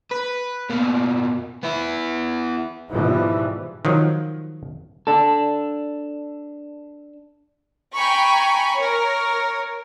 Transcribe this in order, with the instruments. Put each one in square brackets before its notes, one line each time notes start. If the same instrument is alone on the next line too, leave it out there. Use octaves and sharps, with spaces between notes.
[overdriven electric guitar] B4
B2 A#3
B3 E4
[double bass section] G#2 B2 E3 F3 G3
[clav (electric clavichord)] D#3 F3 F#3
[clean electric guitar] D4 A4
[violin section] G5 G#5 A#5 B5 C#6
A#4 C#5